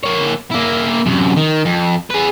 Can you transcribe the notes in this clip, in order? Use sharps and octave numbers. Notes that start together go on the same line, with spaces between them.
A#3 C#5
A#3 E4
F#2 C3
D#3
F2
G#4 B4